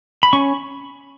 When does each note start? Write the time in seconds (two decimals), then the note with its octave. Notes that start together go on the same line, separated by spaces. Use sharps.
0.23 B5
0.33 C#4 C#6